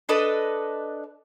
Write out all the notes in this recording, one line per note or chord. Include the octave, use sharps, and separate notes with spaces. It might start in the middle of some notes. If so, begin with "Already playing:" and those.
D4 A4 B4 D#5